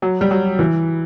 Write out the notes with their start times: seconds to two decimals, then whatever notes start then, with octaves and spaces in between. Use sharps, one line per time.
0.02 F#3
0.21 G3
0.31 F#3
0.59 E3